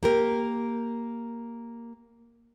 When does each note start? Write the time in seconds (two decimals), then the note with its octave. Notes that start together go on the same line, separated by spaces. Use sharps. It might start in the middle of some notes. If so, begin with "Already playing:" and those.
0.03 A#3 G4 A#4